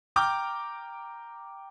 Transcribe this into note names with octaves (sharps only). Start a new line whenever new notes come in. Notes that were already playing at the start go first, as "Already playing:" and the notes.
G5 A#5 D6 F6 G6